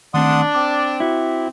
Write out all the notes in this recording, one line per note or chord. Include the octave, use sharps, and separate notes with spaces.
D#3 A3 C4 D4 F#5 C6 D#6
C4 D6
E4 F#4